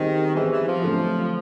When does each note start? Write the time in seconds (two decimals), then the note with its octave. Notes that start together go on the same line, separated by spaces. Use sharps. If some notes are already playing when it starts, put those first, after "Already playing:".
Already playing: D#3 G3 C4 D#4 G#4 C5
0.34 E3 G3 C4 D#4 G#4 C5
0.50 E3
0.66 F3
0.82 D3 F#3 A3 C4 F4